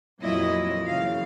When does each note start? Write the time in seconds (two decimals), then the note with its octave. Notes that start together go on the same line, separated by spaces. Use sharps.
0.21 F2 A#2 F#3 E4 D#5
0.86 F#2 C#3 E3 F5